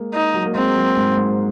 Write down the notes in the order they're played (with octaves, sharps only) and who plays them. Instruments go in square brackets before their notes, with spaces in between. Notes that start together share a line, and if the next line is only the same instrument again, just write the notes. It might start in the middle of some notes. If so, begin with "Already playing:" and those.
Already playing: [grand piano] G#3 A#3
[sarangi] D#4
[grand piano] F#3
A#3
[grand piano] G#3 [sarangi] C4
[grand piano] F#3
G#2
G#2